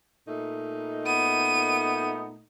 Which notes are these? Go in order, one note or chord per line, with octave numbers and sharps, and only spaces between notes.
A#2 A3 D#4
B3 D#7